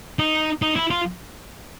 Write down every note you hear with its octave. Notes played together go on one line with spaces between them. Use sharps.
D#4
D#4
E4
F4